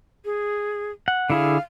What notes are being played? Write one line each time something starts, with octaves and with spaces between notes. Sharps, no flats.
G#4
F#5
D3 E4 G#4 F5